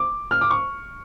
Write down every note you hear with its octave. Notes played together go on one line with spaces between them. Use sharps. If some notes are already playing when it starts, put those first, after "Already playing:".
Already playing: D6
F6
D6
C#6